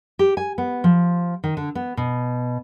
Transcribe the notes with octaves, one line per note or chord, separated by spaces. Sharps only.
G4
G#5
B3
F3
D#3
D3
B3
B2